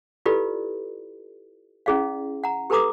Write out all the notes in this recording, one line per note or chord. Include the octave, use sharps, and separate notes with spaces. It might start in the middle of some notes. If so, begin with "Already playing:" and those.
E4 F4 G4 A4 B4 D5
C#4 E4 G#4 D5 F5
F#5 A#5
G4 A4 B4 A#5 D6 D#6